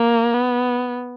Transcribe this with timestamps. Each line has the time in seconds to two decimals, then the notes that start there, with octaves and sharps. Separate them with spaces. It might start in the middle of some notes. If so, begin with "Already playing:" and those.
Already playing: A#3
0.34 B3